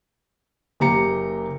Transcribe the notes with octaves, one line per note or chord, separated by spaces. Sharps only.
F#1 A#3 G4 A#5 C#7